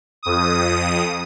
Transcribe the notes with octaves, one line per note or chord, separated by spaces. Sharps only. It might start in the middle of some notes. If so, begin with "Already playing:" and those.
F2 D#6